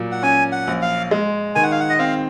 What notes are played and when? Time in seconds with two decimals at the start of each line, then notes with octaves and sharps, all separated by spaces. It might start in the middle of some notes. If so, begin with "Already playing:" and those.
Already playing: A#2 F#3
0.12 F#5
0.23 C#4 G#5
0.52 F#5
0.67 A#1
0.82 F5
1.11 G#3
1.55 D#3 G#5
1.63 F#5
1.72 F5
1.80 F#5
1.90 D#5
1.99 C4 F5